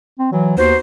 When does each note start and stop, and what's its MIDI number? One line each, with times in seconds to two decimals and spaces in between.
0.20 0.28 60
0.32 0.53 52
0.32 0.57 54
0.58 0.73 39
0.58 0.78 59
0.58 0.78 63
0.58 0.78 66
0.58 0.77 72